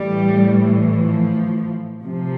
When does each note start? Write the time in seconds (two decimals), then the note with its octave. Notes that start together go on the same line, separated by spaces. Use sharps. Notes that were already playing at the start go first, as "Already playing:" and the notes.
Already playing: A2 E3 G3
0.96 F3
2.03 C3 F3